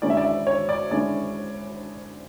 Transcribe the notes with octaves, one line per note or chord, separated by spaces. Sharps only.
D3 G#3 C#4 E4 D5
E5
D5
E5
C#5
D5
D3 G#3 C#4 E4 D5